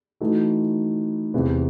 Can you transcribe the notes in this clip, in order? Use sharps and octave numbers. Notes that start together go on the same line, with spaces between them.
E3 A3 D#4 F#4 A4
E2 C3 E3